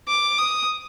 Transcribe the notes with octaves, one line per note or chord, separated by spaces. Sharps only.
D6
D#6